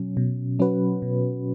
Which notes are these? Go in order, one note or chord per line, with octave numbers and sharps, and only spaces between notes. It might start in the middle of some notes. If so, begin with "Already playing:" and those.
Already playing: B2 F#3 C#4
B2
F#3 C#4 F#4 B4
B2